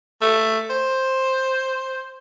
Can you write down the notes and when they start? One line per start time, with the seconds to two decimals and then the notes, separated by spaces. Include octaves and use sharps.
0.21 A3
0.70 C5